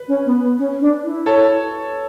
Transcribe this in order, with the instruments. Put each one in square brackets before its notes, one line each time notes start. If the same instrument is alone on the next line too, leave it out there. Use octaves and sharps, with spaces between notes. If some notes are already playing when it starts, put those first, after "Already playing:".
Already playing: [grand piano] B4
[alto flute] C#4
B3
B3
C#4
D4
E4
[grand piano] A4 C#5